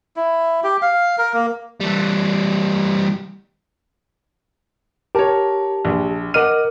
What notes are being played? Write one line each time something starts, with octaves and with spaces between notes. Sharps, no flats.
E4
G4
F5
A#4
A#3
E3 G3
G4 A#4 C#5 A5
A#1
A#4 D#5 F#5 D6 F6 D#7